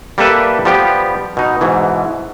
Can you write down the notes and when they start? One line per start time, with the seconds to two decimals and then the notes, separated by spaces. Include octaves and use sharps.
0.18 G3 A#3 G4 A4 B4 E5
0.65 F3 G3 B3 G4
1.37 B2 D#4
1.61 G#2 B2 E3